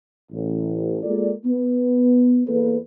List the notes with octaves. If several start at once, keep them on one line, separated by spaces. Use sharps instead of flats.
A1
G#3 A#3 F4 A4 A#4 D5
B3
E2 A#3 A4 B4